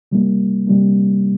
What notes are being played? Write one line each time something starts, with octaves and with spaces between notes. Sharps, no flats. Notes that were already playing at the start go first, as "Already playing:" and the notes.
C3 G3 A#3
C3 G3 A#3